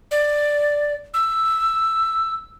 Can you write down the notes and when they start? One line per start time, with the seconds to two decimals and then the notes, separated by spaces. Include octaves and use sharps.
0.11 D5
1.14 E6